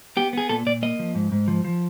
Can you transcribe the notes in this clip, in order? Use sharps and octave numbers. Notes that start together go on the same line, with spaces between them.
B3 G4
B3 G#4
A#2 A4
A#2 D5
A#3 D#5
F3
G#2
G#2
F3
F3